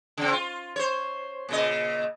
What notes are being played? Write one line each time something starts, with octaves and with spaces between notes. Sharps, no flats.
C#3 C4
F4
C5 C#5
A#2 C#3 D#5